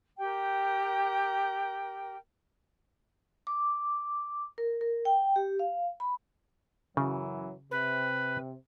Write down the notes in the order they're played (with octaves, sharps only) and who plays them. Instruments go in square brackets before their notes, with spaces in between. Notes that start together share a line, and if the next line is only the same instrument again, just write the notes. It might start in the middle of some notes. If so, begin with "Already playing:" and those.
[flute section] G4 A#4 G5
[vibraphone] D6
A#4
A#4
G5
G4
F5
B5
[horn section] F#2 E3 F#3 [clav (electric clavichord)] C#3
[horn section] C3 [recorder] B4